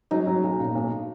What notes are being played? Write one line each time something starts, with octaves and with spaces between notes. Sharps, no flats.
F#3 D#4
F#3
B1
A#2
B1